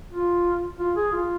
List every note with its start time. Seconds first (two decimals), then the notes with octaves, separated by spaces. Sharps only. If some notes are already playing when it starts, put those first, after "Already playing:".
0.12 F4
0.79 F4
0.96 G#4
1.12 F4